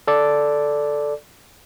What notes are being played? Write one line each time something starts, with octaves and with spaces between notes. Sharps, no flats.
A4 D5